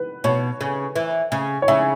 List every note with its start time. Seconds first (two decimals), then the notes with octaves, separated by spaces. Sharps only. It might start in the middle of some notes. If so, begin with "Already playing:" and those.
Already playing: B4
0.24 B2 C#5
0.61 C#3
0.96 E3
1.32 C#3
1.62 C#5
1.68 C#3 E5